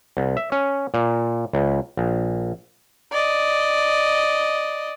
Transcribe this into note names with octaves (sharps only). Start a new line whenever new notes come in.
C2
E5
C#4
A#2
C#2
A#1
D5 D#5